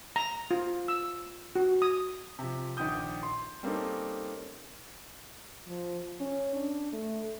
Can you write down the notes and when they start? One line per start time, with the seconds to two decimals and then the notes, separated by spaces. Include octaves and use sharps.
0.16 A#5
0.51 F4
0.88 E6
1.56 F#4
1.82 D#6
2.39 C3 F3
2.77 A#1 D#3 F#5 G5 D#6 G6
3.23 C6
3.63 G3 A#3 C4 C#4 D#4 A4
5.68 F3
6.21 C#4
6.56 D4
6.93 A3